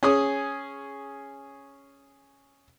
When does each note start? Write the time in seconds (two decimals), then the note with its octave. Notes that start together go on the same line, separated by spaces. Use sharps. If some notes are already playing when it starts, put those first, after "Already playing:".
0.03 C#4 G#4 D#6